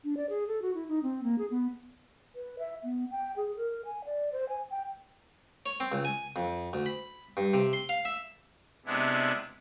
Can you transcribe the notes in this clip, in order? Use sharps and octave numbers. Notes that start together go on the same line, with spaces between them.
D4
D5
G#4
A4
F#4
E4
D#4
C4
A#3
G#4
B3
B4
E5
B3
G5
G#4
A#4
G#5
D5
C5
G#5
G5
C#5
C4
C#2
G#5
F2
D2
B5
G2
C3
C6
F5
E5
C3 G#3 B3 D4 E4